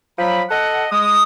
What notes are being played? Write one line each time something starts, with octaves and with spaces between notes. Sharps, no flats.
F3 F#3 B5
A4 D#5 F#5
G#3 D#6